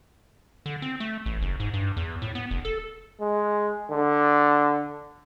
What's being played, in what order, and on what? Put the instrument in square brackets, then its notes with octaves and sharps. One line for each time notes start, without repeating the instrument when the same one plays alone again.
[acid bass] D3
C4
A3
A1
F#1
G#2
G2
E2
A2
B3
F1
A4
[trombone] G#3
D3